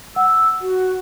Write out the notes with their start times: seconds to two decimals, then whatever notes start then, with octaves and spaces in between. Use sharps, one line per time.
0.16 F#5 E6
0.61 F#4